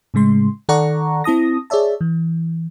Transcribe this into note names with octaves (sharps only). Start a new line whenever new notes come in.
A2 C#3 G#3 C6
D#3 A4 D5 F#5 A#5 C#6
C4 E4 A5 D#6 A#6
G#4 C#5 D5 E5 A5
E3